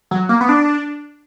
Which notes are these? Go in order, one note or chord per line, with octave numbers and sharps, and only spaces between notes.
F#3
A#3
B3
D4